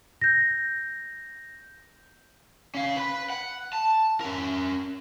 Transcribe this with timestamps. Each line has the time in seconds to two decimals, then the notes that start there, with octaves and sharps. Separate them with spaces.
0.21 G6 A#6
2.75 C#4 F5
2.96 B4 B5
3.30 F#5
3.73 A5
4.21 C#4 A#4